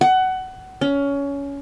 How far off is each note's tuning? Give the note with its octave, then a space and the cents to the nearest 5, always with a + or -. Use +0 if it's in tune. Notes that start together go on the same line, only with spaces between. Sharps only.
F#5 +20
C#4 +20